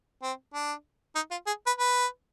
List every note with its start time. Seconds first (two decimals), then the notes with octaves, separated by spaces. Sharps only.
0.23 C4
0.54 D4
1.15 D#4
1.31 F4
1.47 G#4
1.67 B4
1.78 B4